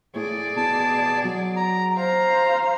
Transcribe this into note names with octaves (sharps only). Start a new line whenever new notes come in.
A2 G#4 D5
B2 A5
F#3
A#5
C5 F5 A#5